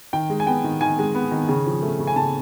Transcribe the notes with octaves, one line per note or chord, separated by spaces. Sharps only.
D#3 G5
G#3
G#5
B3 G5
D#3
D#3 G#5
G#3
B3
D#3
C#3
F3
A3
C#3
G#5
C#3 A5